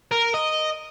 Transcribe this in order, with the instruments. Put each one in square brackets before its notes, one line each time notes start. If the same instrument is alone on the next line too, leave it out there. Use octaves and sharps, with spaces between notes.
[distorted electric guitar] A#4
D#5